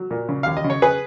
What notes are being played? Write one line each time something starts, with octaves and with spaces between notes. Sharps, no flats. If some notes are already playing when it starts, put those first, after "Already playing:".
Already playing: F#3
A#2
C#3
D#2 F5
D#5
C#3
C#5
G#4 B4